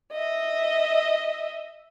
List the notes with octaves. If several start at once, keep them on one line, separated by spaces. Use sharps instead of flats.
D#5 E5